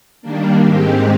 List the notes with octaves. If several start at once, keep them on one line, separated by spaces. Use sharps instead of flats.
D#3 G3 A#3 D4
G#2 D#3 G#3 C4 G4